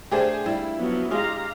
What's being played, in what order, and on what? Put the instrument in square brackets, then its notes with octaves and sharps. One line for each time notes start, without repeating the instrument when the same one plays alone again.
[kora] A3 D4 [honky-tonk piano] G4 G#4 C5
[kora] G3 F5 [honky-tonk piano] E4
[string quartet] F3 F#3 B3
[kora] G#3 F4 G#4 [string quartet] G4 F5 A#5